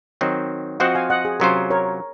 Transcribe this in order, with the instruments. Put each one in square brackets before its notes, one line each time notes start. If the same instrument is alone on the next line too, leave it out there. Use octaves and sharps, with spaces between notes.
[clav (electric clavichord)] D#3 F#3 C4 D#4
[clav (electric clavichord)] F3 C4 F#4 C5 [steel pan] D#5 F#5
[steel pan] F5 G#5
D#5 F#5
G#4
[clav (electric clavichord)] C3 F#3 C#4 F4 C5 [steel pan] A#4
[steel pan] A#4 C#5